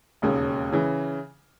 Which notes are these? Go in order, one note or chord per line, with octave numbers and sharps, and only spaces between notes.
E1 D#2 C#3
C#3 E3